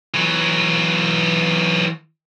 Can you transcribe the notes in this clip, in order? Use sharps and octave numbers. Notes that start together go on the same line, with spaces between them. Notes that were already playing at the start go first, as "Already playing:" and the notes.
E3 F#3